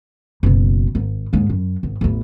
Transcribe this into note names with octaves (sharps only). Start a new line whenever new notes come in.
F#1 B2
G#1
D#2 G#2
F#2
G#1
A1 E2